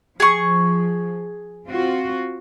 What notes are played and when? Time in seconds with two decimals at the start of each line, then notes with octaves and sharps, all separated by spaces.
0.20 F3 G#4 C#6
1.67 C4 F4 F#4